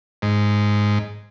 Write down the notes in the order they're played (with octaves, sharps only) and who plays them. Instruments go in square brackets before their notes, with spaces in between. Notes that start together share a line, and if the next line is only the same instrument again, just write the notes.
[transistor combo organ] G#2